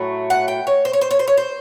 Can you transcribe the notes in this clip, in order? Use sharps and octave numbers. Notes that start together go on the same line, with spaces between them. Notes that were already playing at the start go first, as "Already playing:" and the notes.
Already playing: A2 F#3 A3
F#5
G5
C#5
C5
C#5
C5
C#5
C5
C#5
C5